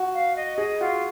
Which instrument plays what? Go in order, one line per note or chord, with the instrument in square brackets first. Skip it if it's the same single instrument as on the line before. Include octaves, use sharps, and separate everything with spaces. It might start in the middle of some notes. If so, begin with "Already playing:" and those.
Already playing: [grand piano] F#4
[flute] F5
D#5
[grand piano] G#4 [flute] D#5
[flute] F4 [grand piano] F#4